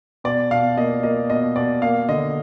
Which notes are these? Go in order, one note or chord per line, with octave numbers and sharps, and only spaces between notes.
B2 D5
B2 F5
A#3 D#5
A#3 D#5
B2 D#5
B2 D5
A#3 F5
D3 D#5